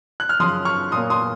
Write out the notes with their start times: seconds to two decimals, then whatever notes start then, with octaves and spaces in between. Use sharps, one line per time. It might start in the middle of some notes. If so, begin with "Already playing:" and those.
0.20 F#6
0.29 F6
0.39 F#2 C#3 F3 C6 D#6
0.65 C#6 F6
0.92 A#2 F#3 A#3 C6 D#6
1.10 C6 D#6